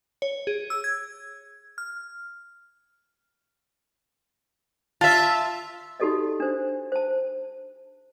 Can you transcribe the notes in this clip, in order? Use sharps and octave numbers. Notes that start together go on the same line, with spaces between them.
C#5
G#4
E6
G#6
F6
F4 E5 A5
D#4 F#4 G4 A4 D5 D#5
D4 C5
C5 A5